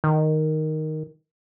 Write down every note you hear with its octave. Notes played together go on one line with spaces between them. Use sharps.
D#3